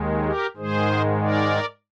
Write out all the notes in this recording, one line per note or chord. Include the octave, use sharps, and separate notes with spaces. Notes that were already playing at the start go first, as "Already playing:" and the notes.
Already playing: D#2 D#3 G#3
G4 A#4
G#2 D#3 G#3 G#4 C5
A#4 D5